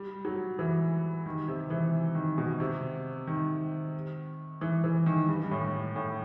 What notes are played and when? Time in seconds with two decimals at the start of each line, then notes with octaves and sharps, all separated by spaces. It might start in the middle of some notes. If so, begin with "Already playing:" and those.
Already playing: G3
0.25 F#3
0.59 E3
1.26 D#3
1.48 C3
1.70 E3
2.15 D#3
2.38 B2
2.60 C3
3.27 D#3
4.61 E3
4.84 E3
5.06 D#3
5.28 G2
5.44 G2
5.51 A2
5.96 A2